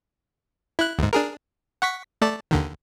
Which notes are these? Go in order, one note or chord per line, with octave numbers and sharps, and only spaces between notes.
E4 F#6
D2 G#2
D4 G#4 A#4
F#5 C#6 B6
A3 D5 A5
D#2 D3 D#3